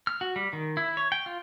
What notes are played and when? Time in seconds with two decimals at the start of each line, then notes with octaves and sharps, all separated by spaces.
0.07 F6
0.21 F#4
0.36 G3
0.53 D#3
0.77 E4
0.97 C#5
1.12 G5
1.26 F4